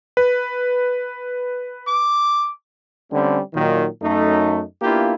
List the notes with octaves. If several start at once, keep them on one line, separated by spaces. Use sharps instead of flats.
B4
D6
D3 G3 A3 C4 C#4
A#2 D#3 F#3
F#2 A3 D#4
A#3 B3 D4 E4 F4 G4